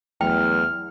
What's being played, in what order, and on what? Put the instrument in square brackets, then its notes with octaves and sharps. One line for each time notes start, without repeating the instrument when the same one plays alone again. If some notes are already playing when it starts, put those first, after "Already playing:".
[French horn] E2 [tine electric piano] F#3 A3 [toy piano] G5 [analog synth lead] F6